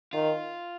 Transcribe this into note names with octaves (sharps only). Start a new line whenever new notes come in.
D#3 F4